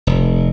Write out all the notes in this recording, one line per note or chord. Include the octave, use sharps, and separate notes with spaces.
F1